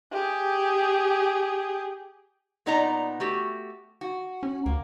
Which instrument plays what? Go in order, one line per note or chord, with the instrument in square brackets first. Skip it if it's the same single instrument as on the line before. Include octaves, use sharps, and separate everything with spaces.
[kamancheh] G4 G#4
[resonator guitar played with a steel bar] A#2 B3 D#4 D5 F#5 A#5
A3 F#4 G4
F#4
[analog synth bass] C#4
[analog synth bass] D2 [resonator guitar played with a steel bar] A#3